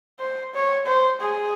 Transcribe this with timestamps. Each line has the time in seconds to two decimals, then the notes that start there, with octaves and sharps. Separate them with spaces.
0.20 C5
0.54 C#5
0.86 C5
1.21 G#4